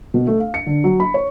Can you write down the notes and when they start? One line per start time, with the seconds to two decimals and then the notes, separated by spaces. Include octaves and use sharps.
0.14 B2
0.27 A3
0.40 F5
0.54 C#7
0.66 D3
0.84 F#3
1.00 B5
1.14 C#5